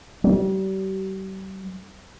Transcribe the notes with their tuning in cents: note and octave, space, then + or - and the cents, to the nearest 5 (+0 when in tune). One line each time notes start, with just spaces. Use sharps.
G3 -40